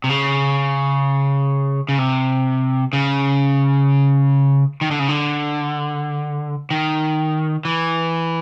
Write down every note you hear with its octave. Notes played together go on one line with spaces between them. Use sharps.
C3
C#3
C#3
C3
C#3
D#3
D3
C#3
D3
D#3
E3